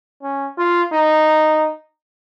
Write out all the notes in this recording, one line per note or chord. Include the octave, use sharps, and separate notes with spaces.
C#4
F4
D#4